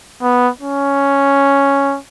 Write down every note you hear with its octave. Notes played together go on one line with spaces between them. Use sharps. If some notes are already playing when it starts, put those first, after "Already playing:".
B3
C#4